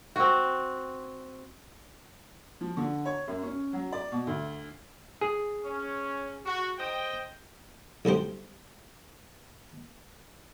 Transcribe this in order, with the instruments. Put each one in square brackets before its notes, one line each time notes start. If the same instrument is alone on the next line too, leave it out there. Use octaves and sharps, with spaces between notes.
[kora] C4 F#4
[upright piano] F3
D3
C#5
F#2
C#4
F#3
D5
B2
D2
[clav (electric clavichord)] G#4
[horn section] C#4
F#4
C5 D#5 G5
[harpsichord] B1 D3 G3 C5